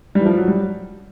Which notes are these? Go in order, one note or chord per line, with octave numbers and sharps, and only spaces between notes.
G3
E3
F3
F#3
G3